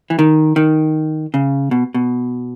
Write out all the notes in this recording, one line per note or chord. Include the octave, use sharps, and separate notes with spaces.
E3
D#3
D#3
C#3
B2
B2